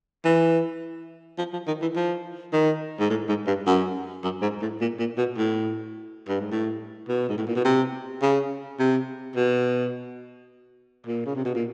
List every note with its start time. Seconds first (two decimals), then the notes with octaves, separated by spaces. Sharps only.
0.25 E3
1.38 F3
1.53 F3
1.67 D#3
1.82 E3
1.96 F3
2.53 D#3
3.00 G#2
3.10 A2
3.28 G#2
3.47 G2
3.66 F#2
4.24 F#2
4.42 G#2
4.62 A2
4.81 A#2
4.99 A#2
5.18 B2
5.38 A2
6.28 G2
6.41 G#2
6.51 A2
7.08 B2
7.29 G#2
7.38 A2
7.47 A#2
7.56 B2
7.65 C3
8.22 C#3
8.79 C3
9.36 B2
11.06 A#2
11.26 C#3
11.35 C3
11.45 B2
11.55 A#2